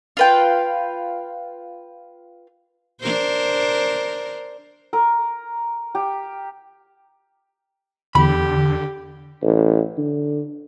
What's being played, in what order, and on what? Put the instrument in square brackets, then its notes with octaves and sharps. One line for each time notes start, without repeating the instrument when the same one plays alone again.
[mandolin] F4 B4 G5
[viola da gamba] D4 A#4 C5
[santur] A#4
G4
[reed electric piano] E2 [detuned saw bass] D3 [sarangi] G4 [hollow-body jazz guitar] B5
[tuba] A1
D3